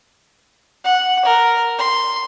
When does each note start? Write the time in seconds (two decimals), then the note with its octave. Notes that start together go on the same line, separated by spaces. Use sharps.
0.85 F#5
1.25 A#4
1.79 C6